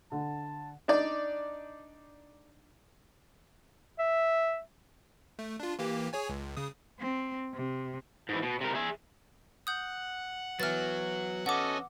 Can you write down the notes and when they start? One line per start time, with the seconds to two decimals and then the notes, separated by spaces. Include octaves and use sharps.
0.12 D3 A5
0.88 D4 D#4 D5
3.99 E5
5.39 A3
5.60 D4 F4
5.79 E3 A#3 G4
6.13 G#4 C#5 G#5
6.29 C#2
6.57 C#3 D#6
6.99 C4
7.54 C3
8.29 G#2 E3
8.43 B2
8.61 C3 A#4
8.75 G#4 E5
9.67 F#5 D#6 G6
10.60 E3 F#3 B3 F6 A6
11.46 C#4 F#4 A4 D#5 F#5 D6